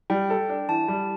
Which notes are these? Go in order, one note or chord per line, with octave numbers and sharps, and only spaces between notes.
G3 G5
A4
D4
E3 A5
G3